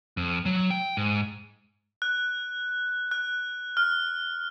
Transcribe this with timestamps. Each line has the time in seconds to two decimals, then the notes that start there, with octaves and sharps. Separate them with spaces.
0.17 F2
0.45 F#3
0.70 G5
0.97 G#2
2.02 F#6
3.11 F#6
3.77 F6